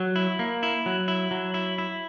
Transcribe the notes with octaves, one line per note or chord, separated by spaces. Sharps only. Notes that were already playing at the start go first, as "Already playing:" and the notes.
Already playing: F#3
E4
A#3
E4
F#3
E4
F#3
E4
E4